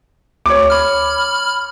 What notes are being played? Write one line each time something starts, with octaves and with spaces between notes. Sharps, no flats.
D2 C#5 D6
B5 F6